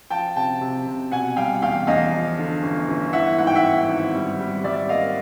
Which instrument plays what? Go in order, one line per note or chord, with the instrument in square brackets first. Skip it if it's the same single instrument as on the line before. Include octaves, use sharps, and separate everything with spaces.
[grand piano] F3 G5 A5
C3 G5 A5
C3
C3
B2 F#5 G#5
G3 F5 G5
E2 F5 G5
E2 D#5 F5
F3
D3
G1
G1
E3 E5 F#5
G#2 F#5
G5
E5 F#5
G#2
G#1
G3
G3
G3 D5 E5
A#3 D#5 F5